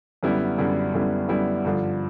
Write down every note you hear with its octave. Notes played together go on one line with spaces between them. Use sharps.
F#2 D3 G3 B3 E4
F#2 D3 G3 B3 E4
F#2 D3 G3 B3 E4
F#2 D3 G3 B3 E4
G2 D3 F3